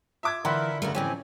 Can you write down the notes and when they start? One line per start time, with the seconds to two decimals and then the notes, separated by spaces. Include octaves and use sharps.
0.23 F4 E5 D6 G#6
0.45 D3 E3 A#4 E5 F#5 B5 C6
0.82 G2 C#3 A3 B3 F#4 A#4
0.95 F2 A2 E3 C4 C#4 G4 G#5